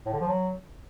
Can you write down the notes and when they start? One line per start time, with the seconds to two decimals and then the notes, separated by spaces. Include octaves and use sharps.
0.06 A2
0.13 D3
0.21 F3
0.28 F#3